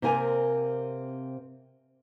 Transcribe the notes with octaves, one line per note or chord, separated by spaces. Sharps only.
C3 A#3 C4 A#4 G#5